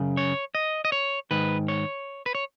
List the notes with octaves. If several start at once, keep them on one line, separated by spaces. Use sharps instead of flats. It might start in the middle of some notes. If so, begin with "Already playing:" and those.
Already playing: F#2 C#3
C#5
D#5
D#5
C#5
G#2 D#3 B4
C#5
B4
C#5